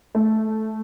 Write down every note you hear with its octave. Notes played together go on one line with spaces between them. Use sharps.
A3